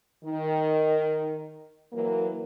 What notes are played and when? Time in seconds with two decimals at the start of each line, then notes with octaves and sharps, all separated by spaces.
0.23 D#3
1.93 E3 F#3 A#3